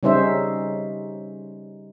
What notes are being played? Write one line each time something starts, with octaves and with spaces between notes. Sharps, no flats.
C#3 G3 C#4 D#4 C5 E5